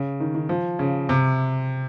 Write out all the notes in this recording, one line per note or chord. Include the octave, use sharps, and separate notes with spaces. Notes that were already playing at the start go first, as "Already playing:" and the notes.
Already playing: C#3
D#3
D#3
F3
C#3
C3